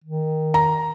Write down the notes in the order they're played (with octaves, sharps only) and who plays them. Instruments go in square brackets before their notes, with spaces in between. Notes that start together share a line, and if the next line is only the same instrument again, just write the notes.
[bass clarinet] D#3
[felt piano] A#5